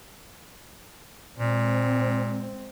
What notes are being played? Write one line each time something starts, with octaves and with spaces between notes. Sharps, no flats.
A#2 G#3 C4